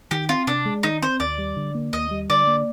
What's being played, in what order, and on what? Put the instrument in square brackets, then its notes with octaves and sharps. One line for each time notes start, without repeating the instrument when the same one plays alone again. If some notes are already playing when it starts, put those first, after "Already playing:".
[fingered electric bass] D#3 [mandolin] G4
[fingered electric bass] C4 [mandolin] F4
[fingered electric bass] C3 [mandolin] D4
[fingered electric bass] G#3
[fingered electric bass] D#3 [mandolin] D#4
[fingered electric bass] C4 [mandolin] C5
[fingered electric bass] D#2 [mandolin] D5
[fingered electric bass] G3
D3
A#3
[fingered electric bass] D#2 [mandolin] D#5
[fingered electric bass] G3
[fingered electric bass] D3 [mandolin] D5
[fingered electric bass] A#3